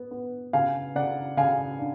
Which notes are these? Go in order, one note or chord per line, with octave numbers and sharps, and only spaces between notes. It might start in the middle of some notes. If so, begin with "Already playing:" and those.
Already playing: B3
B3
C#3 F5 G#5
C#3 D5 F#5
C#3 F5 G#5
D4